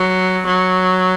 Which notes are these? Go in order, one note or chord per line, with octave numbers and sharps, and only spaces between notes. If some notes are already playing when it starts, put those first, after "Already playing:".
Already playing: F#3
F#3